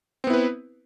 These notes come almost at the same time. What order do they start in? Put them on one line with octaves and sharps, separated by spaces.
C4 B3 E4 B4